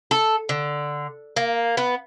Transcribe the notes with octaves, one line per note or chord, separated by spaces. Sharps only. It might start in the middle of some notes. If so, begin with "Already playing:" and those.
A4
D3
A#3
B3